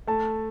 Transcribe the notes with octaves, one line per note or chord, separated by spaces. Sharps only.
A3 A5